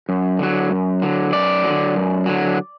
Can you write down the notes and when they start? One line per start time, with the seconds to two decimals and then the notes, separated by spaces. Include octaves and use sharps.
0.09 F#2
0.39 D3 F#3
0.70 F#2
1.02 D3 F#3
1.33 F#2 D5
1.64 D3 F#3
1.95 F#2
2.26 D3 F#3